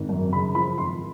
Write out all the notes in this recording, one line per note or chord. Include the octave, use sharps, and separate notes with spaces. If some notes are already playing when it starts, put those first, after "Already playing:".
Already playing: G#1
F#2
C#3 B5
F3 B5
G#1 C6